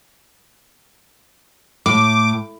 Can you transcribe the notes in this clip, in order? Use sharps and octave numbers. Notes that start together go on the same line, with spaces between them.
A2 D6